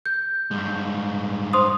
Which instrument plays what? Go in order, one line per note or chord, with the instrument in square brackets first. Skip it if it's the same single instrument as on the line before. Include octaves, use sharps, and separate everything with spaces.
[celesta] G6
[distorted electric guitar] G2 G#3
[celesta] C5 C6 D#6